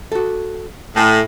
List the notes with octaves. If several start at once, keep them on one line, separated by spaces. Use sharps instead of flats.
F#4 A4
A2 A4 G#5